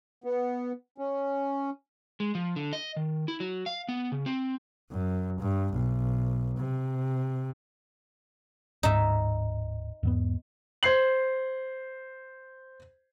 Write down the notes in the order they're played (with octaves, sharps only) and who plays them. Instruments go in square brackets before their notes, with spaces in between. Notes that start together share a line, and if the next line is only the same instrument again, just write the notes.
[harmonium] B3
C#4
[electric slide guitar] G#3
F3
D3
D#5
D#3
E4
F#3
F5
B3
C#3
C4
[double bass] F#2
G2
B1
C3
[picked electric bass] D1 G#2 [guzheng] D#4 E5
[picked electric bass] E2 G#2 B3
[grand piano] C5 G#6 C7 F#7